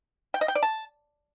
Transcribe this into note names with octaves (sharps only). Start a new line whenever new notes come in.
G5
D#5
G5
D5
A5